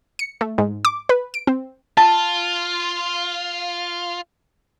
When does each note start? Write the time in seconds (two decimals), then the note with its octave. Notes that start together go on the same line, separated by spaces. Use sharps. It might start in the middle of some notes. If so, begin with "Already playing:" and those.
0.19 C#7
0.41 A3
0.58 G#2
0.85 D6
1.09 B4
1.34 D7
1.47 C4
1.97 F4 A5